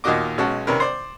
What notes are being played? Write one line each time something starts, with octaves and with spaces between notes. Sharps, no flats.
D#2 A#2 A#3 F#4 D#5 D6
B1 G#3 C#4 F#4 A5
C3 D#3 C#4 D4 A#4 B4
C5 D5